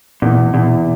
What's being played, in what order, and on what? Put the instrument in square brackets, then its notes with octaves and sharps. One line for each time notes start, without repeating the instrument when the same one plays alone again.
[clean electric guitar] E2 [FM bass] A#2
[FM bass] B2
[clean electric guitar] E2 [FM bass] A#2
[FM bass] B2